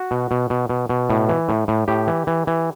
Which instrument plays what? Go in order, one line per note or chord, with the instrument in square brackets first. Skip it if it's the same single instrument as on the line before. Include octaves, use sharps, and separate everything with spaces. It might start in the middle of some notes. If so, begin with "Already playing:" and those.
Already playing: [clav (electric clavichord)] F#4
B2
B2
B2
B2
B2
A2
E3
A2
A2
A2 G4
E3
E3
E3